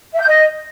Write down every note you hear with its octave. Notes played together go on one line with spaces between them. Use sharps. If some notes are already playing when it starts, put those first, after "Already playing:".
E5
G6
D#5